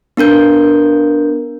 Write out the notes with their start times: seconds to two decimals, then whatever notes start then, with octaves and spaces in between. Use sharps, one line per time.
0.17 B3 D4 A#4 G6